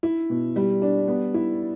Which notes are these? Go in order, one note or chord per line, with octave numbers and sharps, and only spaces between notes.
E4
B2
G3
D4
B3
E4